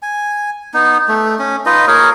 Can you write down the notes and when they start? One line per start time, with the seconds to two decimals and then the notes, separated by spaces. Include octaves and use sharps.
0.02 G#5
0.74 B3 D#4
1.08 A3
1.39 C#4
1.66 D#4 F4 B4 D#5
1.87 A#3 G#4 A#4 C#5